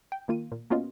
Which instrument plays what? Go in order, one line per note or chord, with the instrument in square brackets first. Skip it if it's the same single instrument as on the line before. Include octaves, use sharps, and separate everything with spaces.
[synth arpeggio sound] G5
D#3 A#3 F4 D#7
A#2
A#3 B3 C#4 F4 F#4 D#5